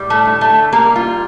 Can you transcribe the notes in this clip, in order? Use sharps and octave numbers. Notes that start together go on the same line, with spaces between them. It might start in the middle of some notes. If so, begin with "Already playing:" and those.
Already playing: A2 G3
A3
D3
A3
G3 A#3
F4